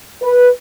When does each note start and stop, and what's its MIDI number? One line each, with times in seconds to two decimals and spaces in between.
0.22 0.48 71